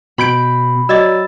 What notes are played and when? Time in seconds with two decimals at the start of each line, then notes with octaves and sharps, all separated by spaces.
0.18 B2 B5 G6 D7
0.89 F#3 D5 D#5 D6 E6 A6